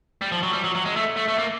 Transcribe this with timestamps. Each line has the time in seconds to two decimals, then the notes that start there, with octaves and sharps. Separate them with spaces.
0.22 G3
0.32 F3
0.43 F#3
0.53 G3
0.64 F#3
0.75 F#3
0.85 G#3
0.96 A3
1.17 A3
1.28 A3
1.38 A#3